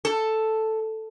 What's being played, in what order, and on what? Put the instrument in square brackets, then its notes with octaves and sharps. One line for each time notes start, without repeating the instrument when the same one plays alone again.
[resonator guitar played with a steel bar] A4